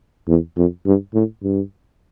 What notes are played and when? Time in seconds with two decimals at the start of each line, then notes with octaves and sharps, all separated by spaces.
0.28 E2
0.57 F2
0.86 G2
1.14 A2
1.43 G2